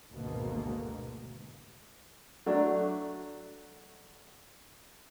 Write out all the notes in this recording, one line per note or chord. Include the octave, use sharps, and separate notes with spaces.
G#1 D2 G#2 B2 G#3 A#3
F#3 A3 D4